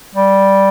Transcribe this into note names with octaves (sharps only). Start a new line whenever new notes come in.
G3